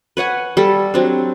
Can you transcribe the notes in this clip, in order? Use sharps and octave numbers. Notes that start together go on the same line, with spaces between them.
B4 C#5 F#5 G#5
G3 A4
F#3 C4 D4